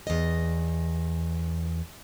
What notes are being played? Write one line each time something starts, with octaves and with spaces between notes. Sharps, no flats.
E2 D#5